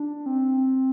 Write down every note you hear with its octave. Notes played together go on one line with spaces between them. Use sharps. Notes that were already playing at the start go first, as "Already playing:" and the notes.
Already playing: D4
C4